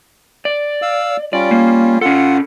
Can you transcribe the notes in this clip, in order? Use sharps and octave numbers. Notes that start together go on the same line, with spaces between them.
D5
F5 E6
G3 C#4 F4 D5
A#3
C#4 F4 A4 F#5